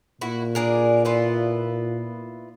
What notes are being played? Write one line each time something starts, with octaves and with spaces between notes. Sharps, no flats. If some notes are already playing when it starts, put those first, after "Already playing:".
A#2 E4 F#4
D4 G#4 A#4
B3 E4 F4